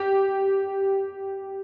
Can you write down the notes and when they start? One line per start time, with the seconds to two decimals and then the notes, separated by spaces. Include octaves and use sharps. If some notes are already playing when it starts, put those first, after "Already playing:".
Already playing: G4